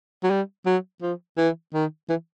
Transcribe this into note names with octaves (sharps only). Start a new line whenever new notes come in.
F#3
G3
F#3
F3
E3
D#3
E3